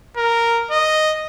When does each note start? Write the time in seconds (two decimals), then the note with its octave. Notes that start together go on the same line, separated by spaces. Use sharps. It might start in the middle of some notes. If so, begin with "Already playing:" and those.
0.17 A#4
0.71 D#5